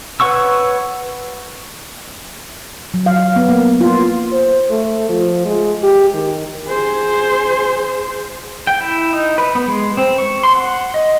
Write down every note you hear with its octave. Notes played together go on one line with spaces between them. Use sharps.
B4 C#5 F#5 C#6 E6
F#3
F5
B3
A#3
F4
C5
A3
F3
G#3
G4
D#3
G#4 C5
G5
E4
D#4
B4
B3
G#3
C4
C#6
C6
F#5
D#5